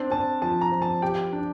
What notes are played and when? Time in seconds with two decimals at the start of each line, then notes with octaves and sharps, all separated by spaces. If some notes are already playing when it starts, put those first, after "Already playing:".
Already playing: C4 D4
0.11 C4 A5
0.42 F3 A5
0.61 A#5
0.72 F3
0.82 A5
1.02 G4 G5
1.33 D4